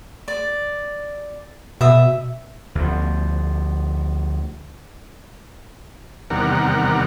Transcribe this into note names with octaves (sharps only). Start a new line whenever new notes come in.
D5
B2 E5 D#6
D2 F3
E2 C3 D#3 G3 A#4 F#5